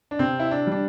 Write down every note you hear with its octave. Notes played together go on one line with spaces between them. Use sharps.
D4
C3 C4
E4
D4
G3 D4